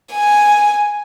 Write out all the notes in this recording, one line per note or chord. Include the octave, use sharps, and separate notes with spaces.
G#5